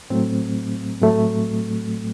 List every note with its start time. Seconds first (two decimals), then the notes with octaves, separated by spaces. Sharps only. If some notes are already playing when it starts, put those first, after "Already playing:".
0.10 A2 F#3 A3 C4
1.02 A2 F#3 A3